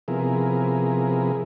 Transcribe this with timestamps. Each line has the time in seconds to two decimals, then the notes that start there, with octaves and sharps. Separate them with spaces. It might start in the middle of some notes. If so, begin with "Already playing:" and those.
0.08 C3 F3 B3 E4 G#4 A#4